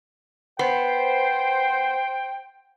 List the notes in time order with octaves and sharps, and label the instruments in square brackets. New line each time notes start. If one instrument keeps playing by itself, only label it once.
[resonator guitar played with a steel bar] B3 [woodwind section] C5 [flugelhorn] G5